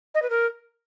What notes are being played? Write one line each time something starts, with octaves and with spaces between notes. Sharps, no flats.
D#5
B4
A#4